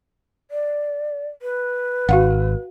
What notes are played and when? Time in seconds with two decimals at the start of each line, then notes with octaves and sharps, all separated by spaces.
0.51 D5
1.42 B4
2.09 G#1 F#4 F5 F#5